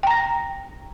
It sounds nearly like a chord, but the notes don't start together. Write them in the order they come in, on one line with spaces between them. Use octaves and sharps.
G5 A#5 A#6